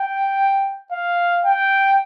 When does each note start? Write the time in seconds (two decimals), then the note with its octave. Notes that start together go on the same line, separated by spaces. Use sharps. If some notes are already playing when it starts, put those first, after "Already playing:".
Already playing: G5
0.92 F5
1.45 G5